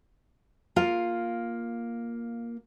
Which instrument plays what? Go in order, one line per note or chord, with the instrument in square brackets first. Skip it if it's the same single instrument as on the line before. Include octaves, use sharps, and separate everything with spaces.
[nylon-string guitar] A#3 F4 F5